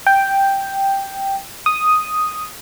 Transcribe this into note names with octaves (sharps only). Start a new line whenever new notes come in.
G5
D#6